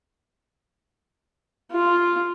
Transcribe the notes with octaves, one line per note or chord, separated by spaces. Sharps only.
F4